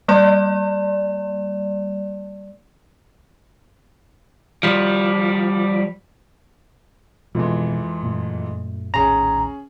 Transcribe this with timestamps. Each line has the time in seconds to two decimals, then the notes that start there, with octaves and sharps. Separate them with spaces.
0.08 G3 A#3 D5
4.63 F3 G3
7.35 D1 F2 G#2 B2 E3 F3
8.03 F#2 A#2 A3
8.94 A#1 D#2 A2 C#4 G#4 A#5